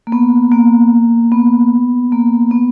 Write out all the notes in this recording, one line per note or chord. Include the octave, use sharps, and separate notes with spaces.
A#3
B3
A#3
B3
A#3
B3